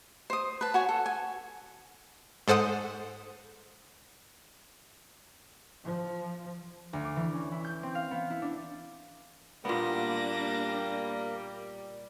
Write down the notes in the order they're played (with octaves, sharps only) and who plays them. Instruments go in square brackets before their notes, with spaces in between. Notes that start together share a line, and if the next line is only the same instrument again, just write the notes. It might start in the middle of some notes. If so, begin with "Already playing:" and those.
[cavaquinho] C5 D#6
B4 A5
F#4 C#5 G#5
A4
G#5
[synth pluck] G#2 A4 C5 F#5 D#6
[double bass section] F3
[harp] D2
D6
E3
C#4
E4
G6
C4
F5
B3
E4
D4
[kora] A#2 B3 [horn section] G3 [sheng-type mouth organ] A#3 [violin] D4 A#6